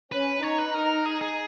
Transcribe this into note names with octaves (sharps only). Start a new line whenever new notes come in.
C#4 B4
D#4 C#5
B4
A#4
G#4
G#4